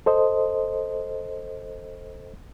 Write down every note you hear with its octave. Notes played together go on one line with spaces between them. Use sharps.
A4 C5 D#5